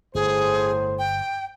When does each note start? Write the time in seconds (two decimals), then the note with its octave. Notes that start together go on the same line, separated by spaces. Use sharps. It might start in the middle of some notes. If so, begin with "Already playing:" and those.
0.15 G1 A2 G#4 C5
0.99 G5